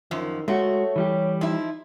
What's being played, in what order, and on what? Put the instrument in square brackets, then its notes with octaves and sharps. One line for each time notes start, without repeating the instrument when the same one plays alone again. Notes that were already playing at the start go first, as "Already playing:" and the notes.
[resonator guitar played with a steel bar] F#2 F3 [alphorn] D#3
[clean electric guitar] G#3 F#4 [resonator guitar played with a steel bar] A3 [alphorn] C#5
[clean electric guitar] E3 G3 G4
[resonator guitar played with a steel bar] F3 E4 [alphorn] D#4